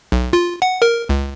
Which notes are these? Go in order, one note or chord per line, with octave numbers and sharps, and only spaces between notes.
B1
F4
F#5
A#4
C#2